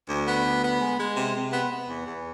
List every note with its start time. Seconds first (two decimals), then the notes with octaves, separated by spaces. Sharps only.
0.09 D2
0.27 B3
0.45 D2
0.63 B3
0.81 G#3
0.99 G#3
1.16 C3
1.35 C3
1.53 B3
1.70 B3
1.89 E2
2.07 E2